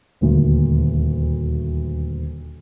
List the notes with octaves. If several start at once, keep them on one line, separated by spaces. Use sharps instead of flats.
D#1 D2